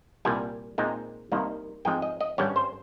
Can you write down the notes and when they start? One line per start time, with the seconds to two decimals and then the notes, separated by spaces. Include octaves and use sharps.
0.25 C2 A#2 G3 G#5
0.78 A#2 G#3 C4 D#4
1.32 C2 C3 D#3 A#3 D#4
1.85 G#2 F3 G#3 C4 G5
2.02 D#5
2.21 D#5
2.38 G#1 G2 G3 C#4 C#5
2.56 C5